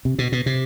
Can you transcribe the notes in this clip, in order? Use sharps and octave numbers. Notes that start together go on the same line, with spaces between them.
C3
B2
B2
C3